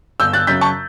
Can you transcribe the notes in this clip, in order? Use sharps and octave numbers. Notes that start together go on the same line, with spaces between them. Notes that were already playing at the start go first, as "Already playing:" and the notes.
G1 E6 G6
F#6 A6
F#2 C#3 F#3 G6 B6
A5 C#6